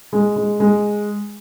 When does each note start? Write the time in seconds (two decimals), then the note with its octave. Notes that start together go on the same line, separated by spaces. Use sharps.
0.13 G#3
0.36 G#3
0.60 G#3